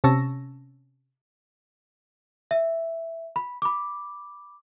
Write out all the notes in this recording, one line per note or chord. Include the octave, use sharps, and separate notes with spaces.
C3 C#4 A5 C#6 E6 A#6
E5
B5
B5 D6